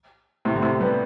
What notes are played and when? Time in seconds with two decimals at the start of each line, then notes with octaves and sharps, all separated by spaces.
0.45 A2 C3
0.56 D3
0.62 A2 C3
0.80 G3 B3